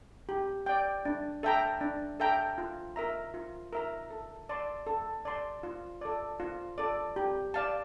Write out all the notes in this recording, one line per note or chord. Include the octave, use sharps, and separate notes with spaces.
G4
D5 G5
D4
A4 E5 G5 A#5
D4
A4 E5 G5 A#5
F4
A#4 E5 A#5
F4
A#4 E5 A#5
A4
D5 A5 C6
A4
D5 A5 C6
F4
A4 D5
F4
A4 D5
G4
D5 F5 A5